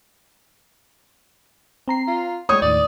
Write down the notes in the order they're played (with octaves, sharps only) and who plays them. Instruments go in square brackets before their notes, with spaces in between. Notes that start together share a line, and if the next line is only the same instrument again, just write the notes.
[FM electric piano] C4 A#5 C7
[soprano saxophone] F4
[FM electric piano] G#3 G6 [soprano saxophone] C#5 [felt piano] D#6
[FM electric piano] D#2 A2 D#3 [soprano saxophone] D5